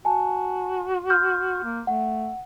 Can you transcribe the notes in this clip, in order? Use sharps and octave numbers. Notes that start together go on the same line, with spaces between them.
F#4 G#5 A5
C6 F6 G6
A#3
A3 F#5